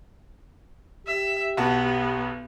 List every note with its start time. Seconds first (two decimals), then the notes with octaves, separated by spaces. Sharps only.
1.07 G4 E5
1.57 B1 B3 F#4 A5